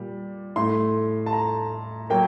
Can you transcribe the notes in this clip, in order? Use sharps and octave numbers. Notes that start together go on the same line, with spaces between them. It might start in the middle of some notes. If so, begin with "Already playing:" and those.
Already playing: A#2 G3
A2 A3 C6
A5
A#5
F#3 A#3 G5